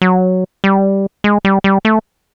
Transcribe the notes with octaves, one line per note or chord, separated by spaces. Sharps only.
F#3
G3
G#3
G3
G3
A3